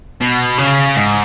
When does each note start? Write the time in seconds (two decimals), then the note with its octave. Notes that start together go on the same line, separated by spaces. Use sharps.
0.21 B2
0.58 C#3
0.96 G#2